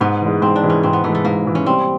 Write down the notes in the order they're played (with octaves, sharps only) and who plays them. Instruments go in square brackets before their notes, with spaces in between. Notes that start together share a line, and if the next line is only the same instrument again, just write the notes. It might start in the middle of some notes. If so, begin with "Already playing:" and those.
[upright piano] G#2 [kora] B3
[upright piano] E3 G#3
[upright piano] G#2 [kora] C4
[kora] D4
[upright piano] E3 G#3
[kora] C#4
[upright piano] G#2 [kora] C4
[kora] B3
[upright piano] E3 G#3 [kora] A3
[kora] A3
[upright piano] G#2 [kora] A#3
[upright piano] E3 G#3
[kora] C#4
[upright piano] G3 [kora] C4